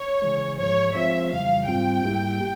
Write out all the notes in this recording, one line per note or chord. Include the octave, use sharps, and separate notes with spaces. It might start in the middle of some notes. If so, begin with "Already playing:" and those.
Already playing: C#5
C#3 E3 G#3
G#2 F3 G#3 C#5
F3 G#3 C4 F4 C5 E5
F2 C#3 E3 G3 F5
G#2 G3 C4 F4 G5
G#2 G3 A#3 E4 G4